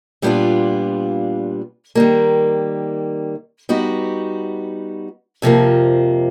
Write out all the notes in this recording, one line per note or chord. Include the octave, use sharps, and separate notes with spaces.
A#2 G3 B3 D4 F4
D#3 G3 A#3
G3 B3 D#4 F#4
F2 C3 F3 A#3